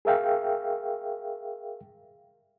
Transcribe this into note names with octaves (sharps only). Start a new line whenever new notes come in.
G#4 A#4 E5 F5 G5